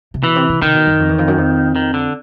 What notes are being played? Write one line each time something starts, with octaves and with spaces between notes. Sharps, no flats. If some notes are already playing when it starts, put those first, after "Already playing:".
C3
B2 E3
C3
C3
C3 D#3
B2
F#2
F2
E2
F2
F#2
F2
D#3
D3